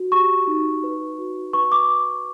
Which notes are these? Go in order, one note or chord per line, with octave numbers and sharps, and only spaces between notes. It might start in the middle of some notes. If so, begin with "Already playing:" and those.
Already playing: F#4
G4 C#6
D#4
B4
F#4
B4 C#6
D6